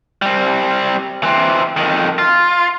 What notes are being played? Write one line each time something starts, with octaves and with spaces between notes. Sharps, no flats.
G3 C4
E3 C4
F2 D#3
F4